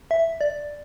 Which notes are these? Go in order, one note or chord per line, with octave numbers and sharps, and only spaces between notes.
E5
D5